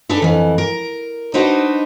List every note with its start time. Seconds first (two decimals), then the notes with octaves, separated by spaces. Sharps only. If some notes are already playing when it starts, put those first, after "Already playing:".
0.09 D4 D#4 G#4 A4 B4
0.22 F2 E3
0.58 A#4
1.34 D4 D#4 F#4 B4 C5 D#5